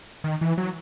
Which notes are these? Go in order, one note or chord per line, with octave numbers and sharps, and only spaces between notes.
D#3
E3
F#3